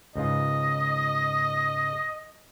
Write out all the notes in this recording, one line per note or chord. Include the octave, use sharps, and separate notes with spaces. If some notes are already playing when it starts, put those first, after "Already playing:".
C#2 G#2 F4 D#5